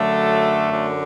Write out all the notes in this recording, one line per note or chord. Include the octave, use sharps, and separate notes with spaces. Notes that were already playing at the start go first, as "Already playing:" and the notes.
Already playing: F#2 D3 F#3 A3
F#2 D3